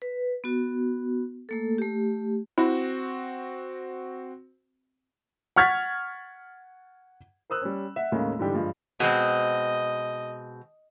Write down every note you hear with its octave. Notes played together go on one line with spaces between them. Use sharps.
B4
B3 F#4
A3 A#3 A4
A3 G4
C4 E4 F#4
F#5 C#6 F6 G#6 A6 B6
A#4 C5 D#6 E6 F#6
G3 C#4
E5 F#5
D#2 A2 C#3 G#3 A#3
G#2 D3 E3 G3 D4 G4
G2 F3 G#3
B2 G#3 C4 D#5